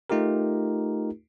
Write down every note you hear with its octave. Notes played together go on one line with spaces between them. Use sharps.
A3 D#4 F4 G4 A#4